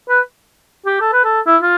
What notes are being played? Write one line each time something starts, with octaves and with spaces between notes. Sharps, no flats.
B4
G4
A4
B4
A4
E4
F4